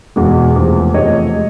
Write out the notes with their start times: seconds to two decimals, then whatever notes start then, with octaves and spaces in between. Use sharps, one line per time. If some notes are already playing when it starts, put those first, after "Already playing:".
0.16 E2 B2 G#3
0.56 E2 C3 F3 A3
0.94 E2 C3 F3 A3 C#5 D#5
1.34 G#3